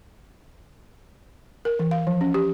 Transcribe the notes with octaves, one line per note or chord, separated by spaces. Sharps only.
A#4
E3
F5
F3
C#4
G4